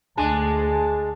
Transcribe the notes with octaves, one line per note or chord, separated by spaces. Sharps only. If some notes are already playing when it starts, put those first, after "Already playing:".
D2 G#3 D4 G#5 A5